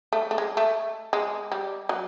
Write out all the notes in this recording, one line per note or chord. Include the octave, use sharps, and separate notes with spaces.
A3
A3
G#3
A3
G#3
G3
F#3